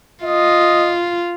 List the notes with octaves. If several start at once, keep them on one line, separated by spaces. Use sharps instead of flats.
F4 D#5